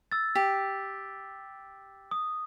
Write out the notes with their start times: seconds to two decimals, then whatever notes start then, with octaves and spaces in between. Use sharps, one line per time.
0.12 E6 A6
0.35 G4 B6
2.11 D#6